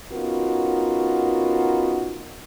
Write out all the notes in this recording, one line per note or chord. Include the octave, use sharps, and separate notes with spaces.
B3 C#4 D#4 F4 F#4 A#4